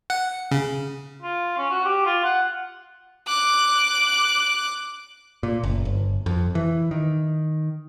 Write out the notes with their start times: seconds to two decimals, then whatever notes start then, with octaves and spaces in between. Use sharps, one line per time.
0.10 F#5
0.51 C#3
1.22 F4
1.57 C#4
1.71 F#4
1.85 G4
2.06 F4
2.24 F#5
3.27 D6 F#6
5.43 A#2
5.63 F#1
5.85 G1
6.26 F2
6.55 E3
6.91 D#3